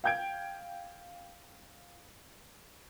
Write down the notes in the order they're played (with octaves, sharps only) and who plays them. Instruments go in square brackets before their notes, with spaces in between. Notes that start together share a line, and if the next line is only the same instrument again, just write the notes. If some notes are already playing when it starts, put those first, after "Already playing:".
[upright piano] F5 G5 G6 G#6 D7